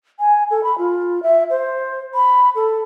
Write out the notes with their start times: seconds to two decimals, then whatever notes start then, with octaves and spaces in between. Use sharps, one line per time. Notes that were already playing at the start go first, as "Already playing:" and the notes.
0.20 G#5
0.51 A4
0.64 B5
0.78 F4
1.23 E5
1.50 C5
2.15 B5
2.55 A4